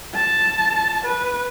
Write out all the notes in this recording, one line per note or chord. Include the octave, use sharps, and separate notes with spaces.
A5
B4